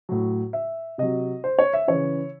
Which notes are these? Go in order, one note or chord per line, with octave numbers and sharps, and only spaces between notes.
A2 F#3
E5
C3 F#3 D#5
C5
C#5
E5
C#3 E3 C#5